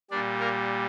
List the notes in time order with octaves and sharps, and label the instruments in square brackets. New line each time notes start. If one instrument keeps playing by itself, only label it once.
[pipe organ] A#2 G3 D4 D5
A#3 A#4